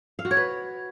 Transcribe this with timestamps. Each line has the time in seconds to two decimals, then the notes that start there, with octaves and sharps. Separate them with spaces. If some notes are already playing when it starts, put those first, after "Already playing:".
0.19 F5
0.25 F#4
0.31 C#5
0.37 B4